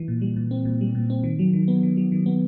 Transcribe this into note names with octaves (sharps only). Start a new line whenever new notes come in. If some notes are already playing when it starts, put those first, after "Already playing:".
Already playing: E3
A#2
G3
A#2
C4
A#2
G3
A#2
C4
D#3
F#3
D#3
B3
D#3
F#3
D#3
B3